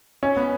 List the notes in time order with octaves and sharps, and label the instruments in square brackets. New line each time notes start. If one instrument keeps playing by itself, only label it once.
[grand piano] C#4
B3